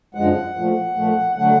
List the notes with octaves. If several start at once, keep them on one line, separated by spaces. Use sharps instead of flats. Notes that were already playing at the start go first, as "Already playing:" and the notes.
F#2 D3 F3 G#3 F#5
A#2 F3 A3
A#2 F3 A3
D3 F#3 A3 F#5